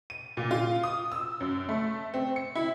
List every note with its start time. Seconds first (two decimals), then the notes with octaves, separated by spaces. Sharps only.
0.10 D#7
0.37 A#2
0.51 F4
0.83 D#6
1.12 E6
1.40 F#2
1.69 A3
2.14 C4
2.36 C#7
2.55 E4